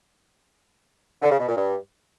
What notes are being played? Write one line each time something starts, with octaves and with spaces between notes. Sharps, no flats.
D3
C#3
B2
A#2
G2